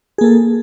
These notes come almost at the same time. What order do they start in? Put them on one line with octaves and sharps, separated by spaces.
G#4 A#3 A4